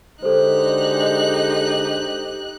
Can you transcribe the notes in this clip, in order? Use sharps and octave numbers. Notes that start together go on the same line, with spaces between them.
D3 G#3 D#4 G4 A4 C5 F#6